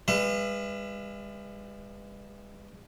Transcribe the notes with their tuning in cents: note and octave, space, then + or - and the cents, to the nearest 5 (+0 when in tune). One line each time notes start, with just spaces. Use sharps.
G#3 -45 B4 +0 E5 +40